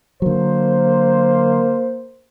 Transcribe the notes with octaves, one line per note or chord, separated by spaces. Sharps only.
D3 F#3 A#3 C5